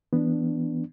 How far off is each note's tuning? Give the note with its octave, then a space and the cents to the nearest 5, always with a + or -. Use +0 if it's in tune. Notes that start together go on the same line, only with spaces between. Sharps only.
E3 +0 B3 +0 D4 +0